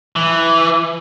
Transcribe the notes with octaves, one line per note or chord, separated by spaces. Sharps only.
E3